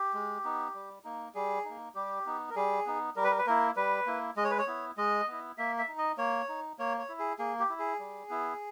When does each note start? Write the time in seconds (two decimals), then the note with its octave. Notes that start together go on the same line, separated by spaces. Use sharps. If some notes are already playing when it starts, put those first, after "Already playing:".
Already playing: G4
0.14 G#3
0.44 B3 D#4
0.74 G3
1.04 A#3 D#4
1.34 G3 G#4
1.65 A#3 D#4
1.95 G3 G4
2.26 B3 D#4
2.50 A#4
2.55 G3 G#4
2.86 B3 D#4
3.16 G3 A#4
3.24 B4
3.31 A#4
3.38 B4
3.46 A#3 E4 A#4
3.76 G3 B4
4.06 A#3 E4
4.36 G#3 D#5
4.44 C#5
4.50 B4
4.58 C#5
4.67 B3 E4
4.97 G#3 D#5
5.28 B3 E4
5.58 A#3 E5
5.78 E5
5.88 D#4
5.98 D#5
6.17 A#3 C#5
6.48 D#4
6.78 A#3 C#5
6.99 C#5
7.09 E4
7.19 G#4
7.39 A#3 G#4
7.59 G4
7.69 E4
7.79 G#4
7.99 G3
8.29 B3 E4